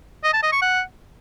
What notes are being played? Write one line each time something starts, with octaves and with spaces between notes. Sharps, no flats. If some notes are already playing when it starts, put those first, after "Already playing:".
D#5
A5
D#5
C#6
F#5